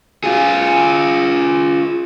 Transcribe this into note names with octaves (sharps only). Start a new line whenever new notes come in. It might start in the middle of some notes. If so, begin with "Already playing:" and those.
F4 G#4